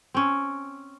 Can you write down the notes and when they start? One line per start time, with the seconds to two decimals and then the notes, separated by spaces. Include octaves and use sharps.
0.14 C4 C#4